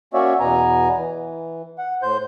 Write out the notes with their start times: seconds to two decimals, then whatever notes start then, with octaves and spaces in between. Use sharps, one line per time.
0.14 A#3 C#4 F#4 C#5 D5 E5
0.40 E2 B2 B3 G#5 A#5
0.97 E3
1.78 F#5
2.03 A2 C5 G6